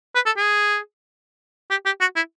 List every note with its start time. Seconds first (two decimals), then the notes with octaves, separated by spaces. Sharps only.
0.15 B4
0.26 A4
0.37 G#4
1.71 G4
1.86 G4
2.01 F#4
2.16 E4